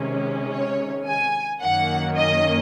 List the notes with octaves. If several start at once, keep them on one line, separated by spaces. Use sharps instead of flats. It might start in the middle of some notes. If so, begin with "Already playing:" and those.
Already playing: C3 D#3 G#3 C#4
C#5
G#5
F#2 D#3 A#3 C#4 F#5
D#5